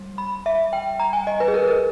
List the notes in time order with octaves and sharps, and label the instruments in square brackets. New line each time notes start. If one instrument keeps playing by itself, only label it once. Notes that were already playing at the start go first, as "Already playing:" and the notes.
Already playing: [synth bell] G3
B5
E5
G5
A#5
G#5
D#5
B4
G#4
A#4
A#4